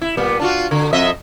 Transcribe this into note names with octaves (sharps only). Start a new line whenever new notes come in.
E4
A#2 G3 B3
D4 F4 F#4
D3
F2 D#5 E5